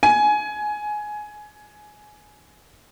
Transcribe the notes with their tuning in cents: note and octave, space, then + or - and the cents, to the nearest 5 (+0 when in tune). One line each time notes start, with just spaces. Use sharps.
G#5 +15